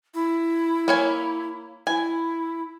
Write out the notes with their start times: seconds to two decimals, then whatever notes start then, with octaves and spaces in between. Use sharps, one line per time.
0.14 E4
0.88 A#3 C#5 G#5
1.87 E4 G#5